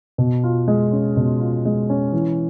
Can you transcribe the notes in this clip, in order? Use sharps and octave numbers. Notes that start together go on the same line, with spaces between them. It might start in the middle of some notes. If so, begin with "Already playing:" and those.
B2
F4
G#3
C#4
B2
F4
G#3
C#4
E3